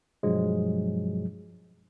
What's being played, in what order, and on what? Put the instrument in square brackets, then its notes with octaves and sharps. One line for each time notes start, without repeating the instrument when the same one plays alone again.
[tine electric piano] G2 B2 F3 F#3 G#3